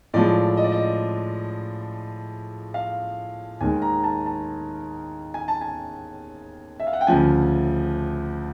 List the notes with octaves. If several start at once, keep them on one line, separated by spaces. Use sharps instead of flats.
A2 F3 G#3 D5
D#5
D5
D#5
F5
D#2 D#3 G#3 G#5
A#5
A5
A5
G#5
A5
G#5
E5
F5
F#5
G5
D2 C#3 F3 G#5